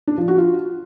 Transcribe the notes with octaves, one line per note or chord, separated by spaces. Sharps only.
D4
F3
F#4
F4